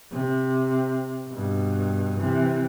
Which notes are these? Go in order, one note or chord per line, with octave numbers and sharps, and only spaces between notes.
C3
G2 B2
C3 E3